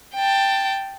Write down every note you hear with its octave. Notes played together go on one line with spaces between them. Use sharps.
G5 A5